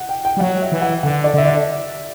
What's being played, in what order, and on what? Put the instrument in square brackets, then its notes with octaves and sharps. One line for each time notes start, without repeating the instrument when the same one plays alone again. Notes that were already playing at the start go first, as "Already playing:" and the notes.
Already playing: [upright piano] F#5
G5
G5
[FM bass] G3
[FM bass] F#3 [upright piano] F#5
[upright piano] E5
[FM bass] E3
[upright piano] F#5
[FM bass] D3 [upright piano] F#5
[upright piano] D5
[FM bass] D3 [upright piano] E5
[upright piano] D5